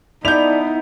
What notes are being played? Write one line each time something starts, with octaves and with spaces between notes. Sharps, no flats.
B3 D#4 E4 A4 D5 G6 F7